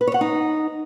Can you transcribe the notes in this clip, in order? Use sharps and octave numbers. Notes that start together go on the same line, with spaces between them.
B4
C#5
F#5
D#4